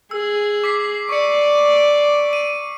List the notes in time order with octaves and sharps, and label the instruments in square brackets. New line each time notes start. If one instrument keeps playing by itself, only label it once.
[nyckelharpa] G#4 [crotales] E6
[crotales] D6 B6 C7
[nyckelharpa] D5 [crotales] C#6 C#7
[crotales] D#7